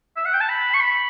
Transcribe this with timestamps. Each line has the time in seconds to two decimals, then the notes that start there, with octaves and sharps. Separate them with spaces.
0.16 E5
0.26 F#5
0.34 G5
0.41 A5
0.49 B5
0.74 C#6
0.80 B5